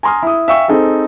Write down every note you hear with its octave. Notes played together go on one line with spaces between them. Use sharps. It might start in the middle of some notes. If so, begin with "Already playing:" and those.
G#5 A#5 C6 D#6 F6
E4 D#6
E5 F5 G5 G#5 C#6 E6
C4 D#4 G#4 A4